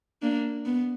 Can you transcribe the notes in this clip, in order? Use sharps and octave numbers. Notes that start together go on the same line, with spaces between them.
A#3 D4
B3